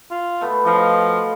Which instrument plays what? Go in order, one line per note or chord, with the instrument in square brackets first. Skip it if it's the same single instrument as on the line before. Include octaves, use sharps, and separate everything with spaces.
[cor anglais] F4
[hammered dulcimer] B2 A3 B3
[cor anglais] F3 [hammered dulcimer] F4 D#5 F5